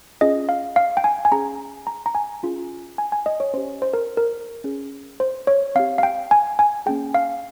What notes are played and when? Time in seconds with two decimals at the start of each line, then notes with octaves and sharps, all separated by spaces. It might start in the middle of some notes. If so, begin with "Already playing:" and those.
0.21 C#4 F4 G#4 D#5
0.49 F5
0.76 F5
0.97 G5
1.04 G#5
1.25 G#5
1.32 C#4 G#4 A#5
1.87 A#5
2.06 A#5
2.15 G#5
2.43 C#4 F4 G#4
2.98 G#5
3.12 G#5
3.26 D#5
3.40 C#5
3.54 C#4 G4 C5
3.82 C5
3.93 A#4
4.17 A#4
4.64 C#4 G#4
5.20 C5
5.47 C#5
5.75 C4 G4 F5
5.98 F5
6.03 G5
6.31 G#5
6.59 G#5
6.86 A#3 C#4 G#4 G5
7.14 F5